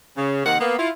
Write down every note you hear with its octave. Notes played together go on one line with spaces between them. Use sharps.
C#3
C3 D#3 A#3 F#5
A#3 B3
E4 F4